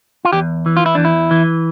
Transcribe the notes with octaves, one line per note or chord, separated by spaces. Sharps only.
F4
E2 G4
E3
F4
E4
E2 D4
E4
E3